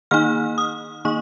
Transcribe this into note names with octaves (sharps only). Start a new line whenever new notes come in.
D#3 A#3 D#4 F6
D#6
D#3 A#3 D#4 C#6